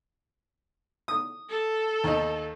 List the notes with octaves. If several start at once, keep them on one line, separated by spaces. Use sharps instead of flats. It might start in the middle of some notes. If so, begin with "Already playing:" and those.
D#6
A4
D#2 D#4